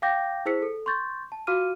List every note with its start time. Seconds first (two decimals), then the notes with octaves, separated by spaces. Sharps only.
0.02 F5 G5 D6 G6 A#6
0.46 E4 G#4 C5 E6 B6 C#7
0.62 A4
0.86 C6 C#6 G6 A6
1.32 A5
1.47 F4 F#4 F5 D6 F6 D#7